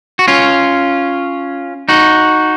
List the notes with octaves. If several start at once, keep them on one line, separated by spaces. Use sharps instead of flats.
F#4
C#4 F4
D#4 F#4